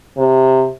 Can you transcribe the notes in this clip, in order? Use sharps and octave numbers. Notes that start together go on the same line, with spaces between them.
C3